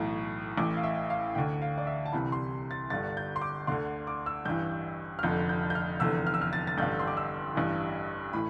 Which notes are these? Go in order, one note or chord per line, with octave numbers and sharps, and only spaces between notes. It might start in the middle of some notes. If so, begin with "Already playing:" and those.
Already playing: B1 A2 E3
A1 A2 E3 D6
F5
E5
F5
D2 D3 G5
F5
D5
E5
A5
C2 C3 E3 B5
C6
A6
G1 G2 D3 A6
G6
C6
D6
D2 D3 C6
D6
E6
A1 G2 E3 G6
F6
F1 F2 D3 G6
G6
G6
F6
F1 E2 D3 E6
F6
E6
F6
A6
A6
A1 G2 D3 G6
C6
D6
E6
A1 G2 E3
A2 E3 B5